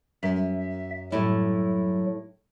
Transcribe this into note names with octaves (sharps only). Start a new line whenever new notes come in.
F#2 E5
A2 F#3 G3 E4